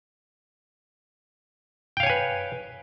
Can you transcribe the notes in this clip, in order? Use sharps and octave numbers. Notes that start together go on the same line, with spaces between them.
B4 C#5 F5 G5 G#5